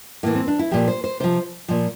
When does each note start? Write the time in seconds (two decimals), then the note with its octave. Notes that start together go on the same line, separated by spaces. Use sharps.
0.23 A2 E3 A#3
0.35 C4
0.48 D4
0.59 E4
0.71 A#2 F3 G4
0.88 C5
1.04 C5
1.20 C3 F3 C5
1.68 A#2 F3